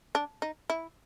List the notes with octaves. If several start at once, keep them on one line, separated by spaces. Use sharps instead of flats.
D4
D#4
E4